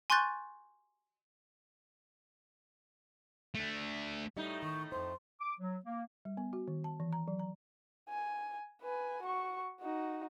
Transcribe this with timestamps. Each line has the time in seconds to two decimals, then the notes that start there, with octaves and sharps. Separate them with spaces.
0.10 G#5 C6 C#6 F#6 G6 A6
3.55 A3 D4
4.37 A2 G3 A3 D#4 E5
4.62 D#3 C#6
4.92 F2 C5 C6
5.40 D6
5.59 F#3
5.85 A#3
6.25 G3
6.37 B3
6.53 F#4
6.68 D#3
6.84 A5
7.00 E3
7.13 A#5
7.28 F#3
7.39 A#5
8.09 G#5
8.82 B4 G#5
9.23 F#4 C#6
9.81 D#4 F#4